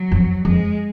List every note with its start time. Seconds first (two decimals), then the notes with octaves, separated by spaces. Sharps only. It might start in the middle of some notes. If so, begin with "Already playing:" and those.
Already playing: F#3
0.11 F2
0.45 F2 G#3